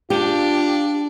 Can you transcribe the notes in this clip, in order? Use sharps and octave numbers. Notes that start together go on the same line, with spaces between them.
D4 F4 G4